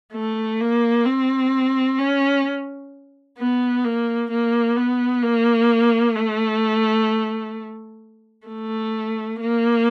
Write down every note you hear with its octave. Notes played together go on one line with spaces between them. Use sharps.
A3
A#3
C4
C#4
B3
A#3
A#3
B3
A#3
A3
A3
A#3